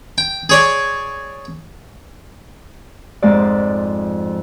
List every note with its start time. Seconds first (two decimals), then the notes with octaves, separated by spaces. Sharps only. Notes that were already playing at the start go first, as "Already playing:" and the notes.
0.18 G5
0.49 G#4 C#5 D5
3.22 F2 G#2 F3 G#3 D5